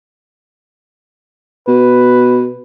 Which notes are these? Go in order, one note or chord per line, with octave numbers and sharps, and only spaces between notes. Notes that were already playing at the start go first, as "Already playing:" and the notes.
B2 B4